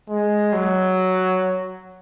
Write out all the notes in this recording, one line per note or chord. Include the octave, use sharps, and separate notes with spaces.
G#3
F#3